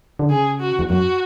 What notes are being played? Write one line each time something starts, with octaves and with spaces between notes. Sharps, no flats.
D3
C#3 G#4
F#4
E2
F#2 F#4